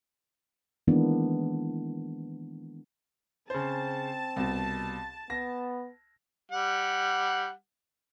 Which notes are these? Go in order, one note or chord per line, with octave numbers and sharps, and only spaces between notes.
D#3 E3 G#3 A#3 B3 D4
C#3 C4 C5 A5
C2 B2
B3 A#6
G3 F#5